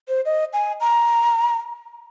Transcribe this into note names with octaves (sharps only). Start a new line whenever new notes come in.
C5
D#5
G#5
A#5